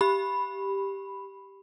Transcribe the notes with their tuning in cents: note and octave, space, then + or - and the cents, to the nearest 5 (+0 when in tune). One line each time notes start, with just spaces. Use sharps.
G4 +0 B5 +0